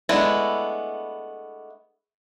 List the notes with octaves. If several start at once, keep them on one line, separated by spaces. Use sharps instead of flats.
G#3 A3 B3 D4 E4